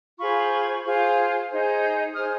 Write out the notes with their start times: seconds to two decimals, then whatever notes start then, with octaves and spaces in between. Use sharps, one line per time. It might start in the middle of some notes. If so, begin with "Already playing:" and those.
0.19 F4 G#4 C5 B5 C#6
0.85 F4 G#4 C5
1.50 D#4 G#4 C5
2.15 D#4 G#4 C5 D#6 F6